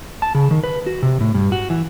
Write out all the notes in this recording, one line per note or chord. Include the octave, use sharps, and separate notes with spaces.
A5
C#3
D#3
B4
F#4
C3
A2
G2
F#4
E3